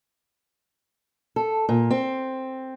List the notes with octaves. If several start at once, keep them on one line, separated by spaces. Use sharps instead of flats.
A4
A#2
C4